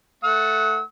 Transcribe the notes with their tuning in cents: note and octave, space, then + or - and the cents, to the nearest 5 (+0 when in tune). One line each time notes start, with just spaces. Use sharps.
A3 +0 F#5 +0 E6 -45